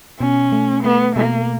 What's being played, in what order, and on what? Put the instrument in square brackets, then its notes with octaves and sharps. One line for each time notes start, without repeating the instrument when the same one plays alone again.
[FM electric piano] B2 [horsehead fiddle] C#4
[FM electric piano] A3
[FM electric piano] A3 [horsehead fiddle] B3
[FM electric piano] B2 [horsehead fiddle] A#3